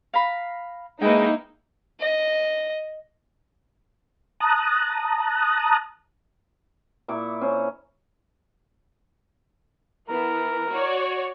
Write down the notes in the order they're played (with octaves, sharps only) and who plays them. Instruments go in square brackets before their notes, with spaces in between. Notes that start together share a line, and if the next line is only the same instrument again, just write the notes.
[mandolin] F5 A#5 B5
[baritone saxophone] G#3 [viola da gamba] A#3 E4 [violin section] D#4 [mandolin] B4 G5
[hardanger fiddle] D#5
[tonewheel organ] A5 A#5 D#6 F#6
[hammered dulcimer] A#2 E4 C#6 D6
C#4 C5
[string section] E3 B3 [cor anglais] A#4
[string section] F#4 C#5 D5